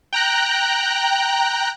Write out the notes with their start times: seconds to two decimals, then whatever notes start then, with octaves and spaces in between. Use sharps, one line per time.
0.13 G5 A#5 F#6